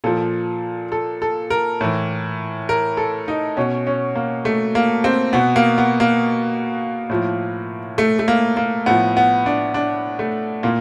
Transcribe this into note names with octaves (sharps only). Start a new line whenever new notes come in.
A#2 F3 A4
A4
A4
A#4
A2 E3
A#4
A4
D#4
B2 C#4
C#4
A#3
A3
A#3
C4
B2 B3
A#3
B3
A#3
A2 F3
A3
A3
A#3
A#3
A2 F3 B3
B3
D4
D4
A3
A#2 A#3